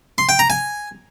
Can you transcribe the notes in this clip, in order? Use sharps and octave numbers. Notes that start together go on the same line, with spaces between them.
C6
G5
A#5
G#5